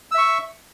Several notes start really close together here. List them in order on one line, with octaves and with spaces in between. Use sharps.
E6 E5 C#6